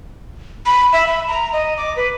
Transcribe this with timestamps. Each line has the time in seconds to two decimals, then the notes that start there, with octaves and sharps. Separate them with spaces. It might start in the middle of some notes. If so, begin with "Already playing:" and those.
0.66 B5
0.93 E5
1.07 B5
1.28 A#5
1.53 D#5
1.77 D6
1.96 B4